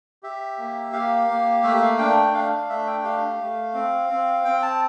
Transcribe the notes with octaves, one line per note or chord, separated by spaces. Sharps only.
G4 E5
A#3
G4 F5
A#3
A3 E5
F5
D4 G5
G5
D4 F5
F5
A3 E5
G5
G4 F5
A3
C4
C4
C4 G5
A5